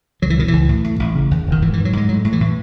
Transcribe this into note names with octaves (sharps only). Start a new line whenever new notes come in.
C#2 F#3
E3
B2 D#3
C#2 E3
A2
A2
A1
C#3
D#2
E1
D#3
G#2 E3
G#2 E3
F#3
G#2 G#3
A2 F#3
A2
E3
A2